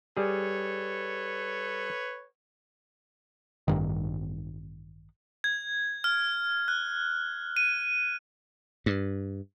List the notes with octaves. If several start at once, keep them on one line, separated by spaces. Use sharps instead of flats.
G3 G#4 A4 B4 C#5
A1 G2 D#3
G#6
F6
F#6
D#7
G2